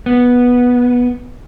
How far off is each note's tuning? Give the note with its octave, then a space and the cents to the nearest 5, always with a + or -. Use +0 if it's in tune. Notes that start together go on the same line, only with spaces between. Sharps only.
B3 -10